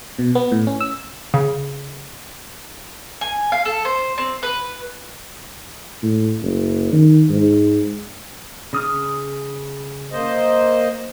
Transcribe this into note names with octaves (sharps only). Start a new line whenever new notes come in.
B2
B3
A2
C#4
E6
C#3
G#5
F5
A4
C5
C4
B4
A2
F#1
D#3
G#2
C#3 D#6 F6
A#3 C5 D#5